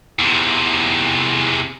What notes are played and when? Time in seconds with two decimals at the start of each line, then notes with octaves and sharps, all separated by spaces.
0.19 E2 C3